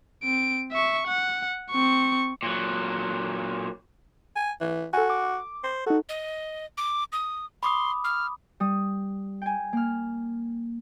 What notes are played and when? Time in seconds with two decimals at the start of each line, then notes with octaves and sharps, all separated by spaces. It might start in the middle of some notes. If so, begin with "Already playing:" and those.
0.23 C4 D7
0.72 E5 C#6
1.07 F#5
1.71 C4 C#6
2.43 A#2 F#3
4.36 G#5
4.61 E3
4.93 F#4 A4 G#5
5.10 D6
5.64 C5
5.86 D#4 F#4 A4
6.09 D#5
6.78 D6
7.13 D#6
7.63 B5 C6 D6 D#6
8.04 F6
8.60 G3 D#6
9.42 G5 G#5
9.73 A#3 F6